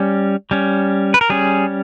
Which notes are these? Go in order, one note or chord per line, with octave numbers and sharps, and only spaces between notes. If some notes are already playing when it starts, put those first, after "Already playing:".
Already playing: G3 C#4
G3 C#4
B4
A#4
G3 C#4 G#4